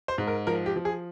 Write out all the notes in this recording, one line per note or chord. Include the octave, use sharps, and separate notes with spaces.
C5
G#2
A#4
F3 A#4
G4
F3
G#4